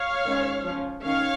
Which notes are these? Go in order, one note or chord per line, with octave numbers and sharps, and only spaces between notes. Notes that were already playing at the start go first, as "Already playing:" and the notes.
Already playing: C#5 F5
D#3 G#3 C#4
F3 C#4
D#3 C#4 C#5 F5